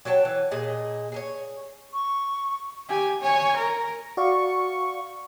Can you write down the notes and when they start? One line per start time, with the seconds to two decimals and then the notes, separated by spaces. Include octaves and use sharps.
0.05 F#3 C#5 G5 A5
0.25 E3
0.51 A#2 G#4 D#5 A5
1.12 G#4 A4 C#5
1.93 C#6
2.89 G4 G#5
3.22 C#5 G#5
3.56 A#4
4.17 F#4 D5 F5 C#6